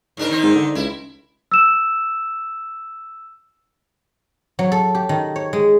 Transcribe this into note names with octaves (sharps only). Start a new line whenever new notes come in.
G#2 D4 A#4
D#3 C4 D#4
G#2
D3
C#2 E4
E6 E7
F#3
A4
G4
D#3
C#5
G#3